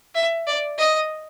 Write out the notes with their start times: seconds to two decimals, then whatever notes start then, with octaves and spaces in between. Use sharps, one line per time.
0.15 E5
0.47 D5
0.78 D#5